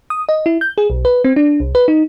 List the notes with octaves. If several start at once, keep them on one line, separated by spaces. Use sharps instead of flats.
D#6
D#5
E4
G6
G#4
B1
B4
C4
D4
C2
B4
D#4